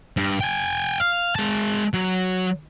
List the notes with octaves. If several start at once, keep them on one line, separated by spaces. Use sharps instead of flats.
G2
G5 G#5
F5
G#3 A5
F#3